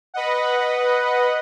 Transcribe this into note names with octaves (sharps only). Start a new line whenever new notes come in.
B4 D#5 F#5